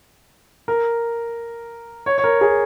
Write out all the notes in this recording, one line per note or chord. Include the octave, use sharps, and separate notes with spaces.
A#4
C#5
C#5
A#4
G#4